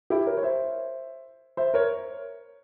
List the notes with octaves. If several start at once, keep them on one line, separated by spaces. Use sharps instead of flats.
E4 G4
A#4 C#5
C#5
C5 E5
C5 E5
A#4 C#5